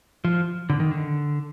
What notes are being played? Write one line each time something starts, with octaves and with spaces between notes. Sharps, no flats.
F3
D3
D#3
D3